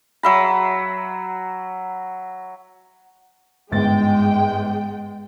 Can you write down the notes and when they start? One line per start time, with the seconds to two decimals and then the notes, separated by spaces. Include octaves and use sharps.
0.23 F#3 E5 B5
3.72 G1 G#2 G#3 G5 A6